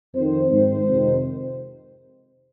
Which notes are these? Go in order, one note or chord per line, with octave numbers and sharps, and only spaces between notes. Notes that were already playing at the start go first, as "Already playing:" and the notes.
F2 D#3 C5
G#2 D#3 C5
F2 C3 D#3